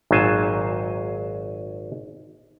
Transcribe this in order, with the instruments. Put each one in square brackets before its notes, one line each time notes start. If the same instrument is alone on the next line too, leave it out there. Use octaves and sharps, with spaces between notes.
[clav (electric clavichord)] G#1 A#2 F#3 C5 G#5 A5